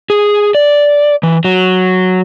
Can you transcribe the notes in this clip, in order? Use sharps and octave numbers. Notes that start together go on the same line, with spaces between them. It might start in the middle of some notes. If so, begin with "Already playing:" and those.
G#4
D5
E3
F#3